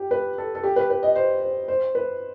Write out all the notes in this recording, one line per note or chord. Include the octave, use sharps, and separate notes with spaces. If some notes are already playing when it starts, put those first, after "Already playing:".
Already playing: G4
B4
A4
A4
G4
B4
B4
D#5
C5
C5
C5
B4